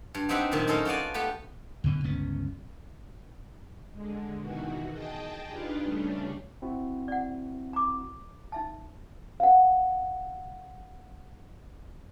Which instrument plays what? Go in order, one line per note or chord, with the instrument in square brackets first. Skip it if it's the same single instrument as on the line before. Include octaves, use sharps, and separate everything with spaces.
[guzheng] G2
B3 C4 D#4 G4 E5 F#5
F#2 A#2 D#3 E5
C#4 D#4 E4 A4 A#4 C5
B3 F4 F#4 D5 G#5
A3 B3 G4 B4
[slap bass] D2 B2 D3
G1 C#2 B3 C#4
[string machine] D3 G#3
B2 D#3 E3 F#4
G#4 D#5 G5 A5
D4 D#4 F4 G4 G#4 B4
C#3 G3 A3 C#4 D4
[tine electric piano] C4 E4 F#4
[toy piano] D5 F#5
A#5 D6
D#4 E5 A5
[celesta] F5 F#5